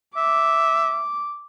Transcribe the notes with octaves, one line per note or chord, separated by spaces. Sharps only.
E5 D6